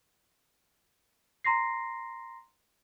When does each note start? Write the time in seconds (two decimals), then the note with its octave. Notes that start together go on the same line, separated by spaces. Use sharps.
1.44 A#5 C6 A#6 C7